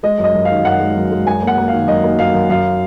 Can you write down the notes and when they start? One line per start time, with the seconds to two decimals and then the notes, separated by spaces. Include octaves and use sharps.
0.03 G#3 D#5
0.18 F#2
0.24 D#5
0.34 F#2
0.45 D#3 F5
0.65 F#2 F#5
0.80 G#3
0.96 F#2
1.11 G#3
1.27 F#2 G#5
1.42 A#3
1.47 F#5
1.58 A#3
1.68 D#3 F5
1.88 F#2 D#5
2.04 A#3
2.19 F#2 F5
2.34 F#2
2.49 F#2 F5